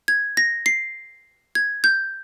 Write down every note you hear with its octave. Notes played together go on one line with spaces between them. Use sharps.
G#6
A#6
C7
G#6
G6